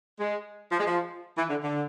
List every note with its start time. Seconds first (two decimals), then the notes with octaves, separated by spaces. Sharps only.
0.20 G#3
0.72 F3
0.79 G#3
0.87 F3
1.38 E3
1.50 D3
1.63 D3